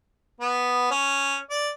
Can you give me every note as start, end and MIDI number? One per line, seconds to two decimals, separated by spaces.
0.40 0.90 59
0.91 1.36 61
1.50 1.69 74